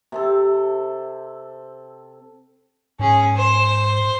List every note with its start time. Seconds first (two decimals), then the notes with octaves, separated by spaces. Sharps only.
0.12 C3 C4 A4
2.99 G#2 C#4 G#4
3.36 C5